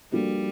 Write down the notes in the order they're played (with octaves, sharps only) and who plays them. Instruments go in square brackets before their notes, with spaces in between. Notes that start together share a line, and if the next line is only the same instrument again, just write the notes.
[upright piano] F3 A#3 D4 F#4 A4 [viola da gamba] G3